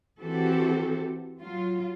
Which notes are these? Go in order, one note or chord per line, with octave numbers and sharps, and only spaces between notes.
E3 C4 F#4 G4 A4
F#3 F4